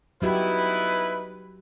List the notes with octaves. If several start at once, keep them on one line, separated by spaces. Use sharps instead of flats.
F#3 B3 D#4 E4 F#4 G4 B4